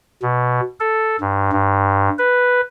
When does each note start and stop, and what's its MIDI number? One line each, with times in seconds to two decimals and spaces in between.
0.22 0.61 47
0.80 1.17 69
1.20 1.51 43
1.52 2.09 43
2.18 2.61 71